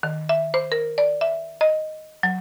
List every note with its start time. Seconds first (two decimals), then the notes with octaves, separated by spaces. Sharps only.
0.03 D#3
0.29 E5
0.54 C5
0.72 A#4
0.98 D5
1.21 E5
1.61 D#5
2.23 F#3